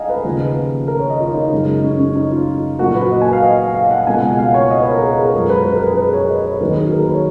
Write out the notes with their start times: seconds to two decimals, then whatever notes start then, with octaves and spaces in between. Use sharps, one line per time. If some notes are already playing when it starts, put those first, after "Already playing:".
Already playing: G#3 D#5 F5 F#5 G#5 A#5
0.09 B4
0.25 D#2 C#3 F3 A#3
0.88 A#4
0.99 C#5
1.10 D#5
1.21 F4
1.31 D#4
1.42 D#4
1.52 F#2 C#3 G#3
1.84 C#4
1.99 C#4
2.15 D#4
2.32 F4
2.79 A#2 F#3 A#3 F#4
2.95 B4
3.11 D#5
3.22 G#5
3.33 F5
3.42 D#5
3.74 F5
3.91 F#5
4.07 C#2 B2 A#3 G#5
4.22 F#5
4.39 F5
4.54 C#5
4.70 D#5
4.81 B4
4.91 A#4
5.02 G#4
5.17 A#4
5.33 F#2 F3 G#3 A#4
5.50 B4
5.66 B4
5.76 A#4
5.86 G#4
5.97 B4
6.13 C#5
6.29 D#5
6.45 B4
6.60 D#2 D#3 F#3 A#3 A#4
6.76 G#4
6.92 A#4
7.03 B4
7.13 C#5